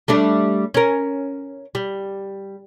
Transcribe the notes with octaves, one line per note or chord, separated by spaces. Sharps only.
G3 A3 D4
C#4 A#4
G3